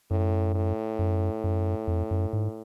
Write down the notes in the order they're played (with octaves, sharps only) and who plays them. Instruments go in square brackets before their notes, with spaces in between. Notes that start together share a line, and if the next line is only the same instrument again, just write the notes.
[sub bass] F#2 [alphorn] A2
[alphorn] A2
[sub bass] F#2
F#2
F2
F#2
G#2